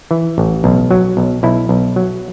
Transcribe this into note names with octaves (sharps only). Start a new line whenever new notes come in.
E3
A1
B1
F#3
B1
B1 E4
B1
F#3